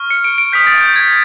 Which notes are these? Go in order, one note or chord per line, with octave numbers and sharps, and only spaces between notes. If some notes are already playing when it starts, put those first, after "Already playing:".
Already playing: C#6 F6
C#7
D7
D7
D#6 G6 B6
A6
G6
G#6